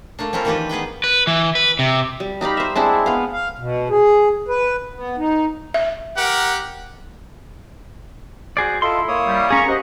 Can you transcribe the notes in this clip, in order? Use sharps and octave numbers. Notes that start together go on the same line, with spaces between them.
A3 A#3 D4
C4 C#4 E4 F4 A#4
D#3 E3 A#3 D4 G4 B4
B3 G#4 B4 G5
B4
E3
B4
C3
G3
D#4 G4 F5 B5
C5 E5
G#3 C4 D4 E4
B3 F5
F5
B2
G#4
B4
B3
D#4
E5
G4 A#4 F#5
F#4 G#4 C5 D5
E4 F4 A4 D#5 C6
A#3 C#5 D#6
G3
C#4 G#4 A#5 C#6
G4 C5 D#5 F#5